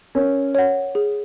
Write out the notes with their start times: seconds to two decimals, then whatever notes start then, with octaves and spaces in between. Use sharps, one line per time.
0.15 C#4 A#4
0.55 C#5 F#5
0.95 G#4